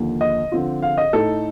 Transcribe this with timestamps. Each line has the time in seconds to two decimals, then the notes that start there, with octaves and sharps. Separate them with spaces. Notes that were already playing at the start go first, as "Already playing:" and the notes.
Already playing: D#2 D3 F3
0.21 D#5
0.52 D3 F3 C4 F4
0.83 F5
0.98 D#5
1.13 A2 A3 D#4 A4